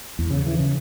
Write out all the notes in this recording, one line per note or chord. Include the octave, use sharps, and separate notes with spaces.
E2
C#3
E3
C#3